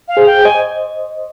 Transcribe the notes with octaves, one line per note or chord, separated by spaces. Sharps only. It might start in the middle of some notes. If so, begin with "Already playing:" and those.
F5
G#4 C5
G5
C5 D#5 G#5